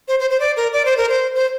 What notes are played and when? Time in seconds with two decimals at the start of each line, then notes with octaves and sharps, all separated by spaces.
0.08 C5
0.20 C5
0.30 C5
0.40 D5
0.57 A#4
0.73 D5
0.85 C5
0.97 A#4
1.09 C5
1.35 C5